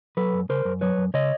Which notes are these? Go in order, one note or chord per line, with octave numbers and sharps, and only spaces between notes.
F#3 A4 B4
F#2
C#3 A#4 C5
F#2
F#3 B4 C#5
F#2
C#3 C#5 D#5